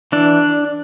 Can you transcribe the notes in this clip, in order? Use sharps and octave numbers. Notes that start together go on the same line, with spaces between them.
E3 D4